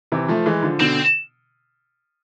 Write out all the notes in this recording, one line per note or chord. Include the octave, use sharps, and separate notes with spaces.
C3 E3
F3 A3
E3 G#3
D3 F3
B2 D3 C4